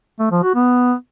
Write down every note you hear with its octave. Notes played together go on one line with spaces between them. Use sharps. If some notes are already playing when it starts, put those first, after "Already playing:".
A3
F3
F#4
B3